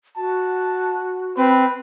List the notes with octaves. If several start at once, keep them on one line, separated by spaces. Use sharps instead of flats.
F#4 A5
C4 B4